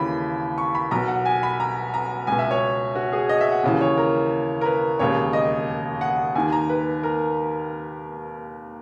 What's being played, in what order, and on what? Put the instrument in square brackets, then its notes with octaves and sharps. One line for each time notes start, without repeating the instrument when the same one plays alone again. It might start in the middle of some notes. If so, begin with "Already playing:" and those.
Already playing: [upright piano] D#2 C#3 E3 B5
C#6
B5
B1 B2 A#5
F#5
G#5
B5
A#5
A#5
C#2 B2 G#5
E5
C#5
F#4
G#4
D#5
E5
F#5
D#2 C#3 E3
C#5
A#4
A#4
B4
E1 D#2 C#3 C#5
D#5
F#5
D#2 D#3 G#5
A#5
B4
A#4